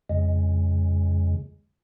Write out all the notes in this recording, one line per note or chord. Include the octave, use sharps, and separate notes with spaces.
F2 C#3 G#3